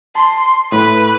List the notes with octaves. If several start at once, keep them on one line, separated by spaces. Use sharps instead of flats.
A5 C6
A2 B4